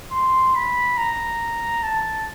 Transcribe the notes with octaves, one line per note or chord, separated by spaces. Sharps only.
C6
B5
A#5
A5